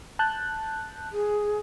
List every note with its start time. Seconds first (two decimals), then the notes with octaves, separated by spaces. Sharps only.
0.19 A5 F#6 G6
1.12 G#4